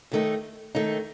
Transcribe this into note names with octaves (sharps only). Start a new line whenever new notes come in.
D#2 D#3 A3 D#4
D#2 D#3 A3 D#4